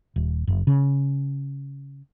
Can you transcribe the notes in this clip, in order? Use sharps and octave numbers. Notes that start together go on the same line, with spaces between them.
D#1
F#1
C#3